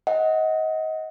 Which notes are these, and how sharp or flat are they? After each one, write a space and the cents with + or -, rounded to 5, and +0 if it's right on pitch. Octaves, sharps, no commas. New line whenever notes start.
D#5 +25 F#5 +0